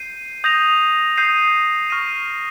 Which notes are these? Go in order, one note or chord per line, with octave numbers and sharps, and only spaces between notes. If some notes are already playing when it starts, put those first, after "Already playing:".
Already playing: G6 C7 D#7
D#6 G6 A#6 F7
D#6 G6 C7 D#7
C#6 F6 A#6 D#7